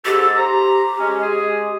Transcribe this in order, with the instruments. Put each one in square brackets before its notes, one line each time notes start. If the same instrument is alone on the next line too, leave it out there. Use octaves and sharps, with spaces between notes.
[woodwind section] G#2 A4 [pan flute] G4
[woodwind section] C5 A#5
G#3 C#4
G#3 G#4